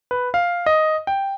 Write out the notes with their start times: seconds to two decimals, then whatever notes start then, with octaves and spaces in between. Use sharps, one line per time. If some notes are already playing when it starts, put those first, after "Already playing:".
0.11 B4
0.34 F5
0.66 D#5
1.07 G5